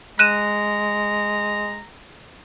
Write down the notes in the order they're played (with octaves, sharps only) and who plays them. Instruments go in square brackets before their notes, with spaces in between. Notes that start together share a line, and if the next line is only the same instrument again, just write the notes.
[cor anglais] G#3 [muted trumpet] A#5 [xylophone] F#6 D#7 E7